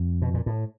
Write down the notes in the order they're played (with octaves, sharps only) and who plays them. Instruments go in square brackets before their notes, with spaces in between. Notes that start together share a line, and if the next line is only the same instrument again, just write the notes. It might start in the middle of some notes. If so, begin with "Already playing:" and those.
Already playing: [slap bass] F2
B2
A#2
A2